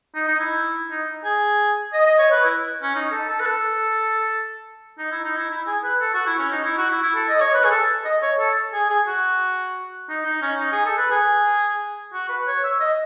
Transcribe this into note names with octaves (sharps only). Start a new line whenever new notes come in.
D#4
D#4
E4
D#4
G#4
D#5
D#5
C#5
B4
E4
C#4
D#4
A4
A4
B4
A4
D#4
E4
D#4
E4
E4
G#4
B4
A4
F#4
E4
C#4
D#4
E4
F#4
E4
E4
A4
D#5
C#5
B4
G#4
A4
D#5
C#5
A4
G#4
G#4
F#4
D#4
D#4
C#4
D#4
G#4
A4
B4
G#4
F#4
B4
C#5
E5
D#5